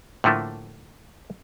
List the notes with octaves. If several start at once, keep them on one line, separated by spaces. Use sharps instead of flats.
A2 D3 F3 A3 A#3